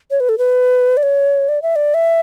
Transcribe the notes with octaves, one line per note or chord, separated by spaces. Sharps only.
C#5
B4
A4
B4
D5
C#5
D5
E5
D5
E5